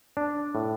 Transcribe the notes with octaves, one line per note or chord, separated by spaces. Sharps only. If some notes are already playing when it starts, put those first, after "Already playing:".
D4
A2